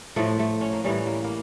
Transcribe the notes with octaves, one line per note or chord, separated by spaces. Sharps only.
A2 F3 A3
A3
C#4
A#3
A2 E3 G3 C#4
A#3
A#3